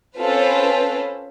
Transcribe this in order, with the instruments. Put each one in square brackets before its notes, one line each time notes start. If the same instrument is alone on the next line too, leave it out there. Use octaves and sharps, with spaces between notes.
[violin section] C4 C#4 F4 A4 B4 C5